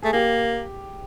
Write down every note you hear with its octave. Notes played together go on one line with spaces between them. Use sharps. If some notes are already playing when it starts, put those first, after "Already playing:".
A3 G#4
A#3 G4